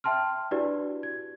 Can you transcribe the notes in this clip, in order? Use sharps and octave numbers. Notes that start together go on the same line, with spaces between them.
E5 G5 A5 C6 F6
D4 E4 F#4 G4 B4 D5
G#6